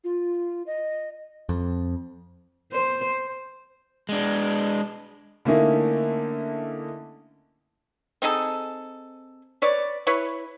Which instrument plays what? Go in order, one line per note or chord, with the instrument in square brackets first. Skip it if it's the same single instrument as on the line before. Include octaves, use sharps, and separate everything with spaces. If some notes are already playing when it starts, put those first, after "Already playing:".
[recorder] F4
D#5
[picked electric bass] F2
[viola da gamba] C5
[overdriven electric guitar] G#3 D4
[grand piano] D3 A3 A#3 C#4 D#4 E4
[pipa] C4 D#4 G#4 A4
B4 C#5 D5
E4 B4 C#5